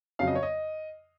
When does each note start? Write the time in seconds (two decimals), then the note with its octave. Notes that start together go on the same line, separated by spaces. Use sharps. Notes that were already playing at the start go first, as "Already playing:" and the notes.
0.19 F2 C#3 F#3 F5
0.27 D#5
0.35 C#5
0.43 D#5